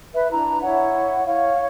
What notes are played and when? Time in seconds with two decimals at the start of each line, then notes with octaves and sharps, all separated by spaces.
0.14 B4 E5
0.31 D4 E4 A#5
0.62 E4 C#5 F#5
1.27 C#5 F5